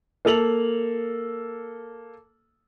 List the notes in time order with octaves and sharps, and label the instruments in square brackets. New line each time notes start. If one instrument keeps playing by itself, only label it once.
[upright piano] A#3 A4 F7 F#7